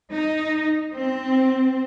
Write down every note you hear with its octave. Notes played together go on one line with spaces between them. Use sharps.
D#4
C4